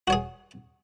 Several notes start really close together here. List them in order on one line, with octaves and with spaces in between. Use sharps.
F#4 C#5 G#4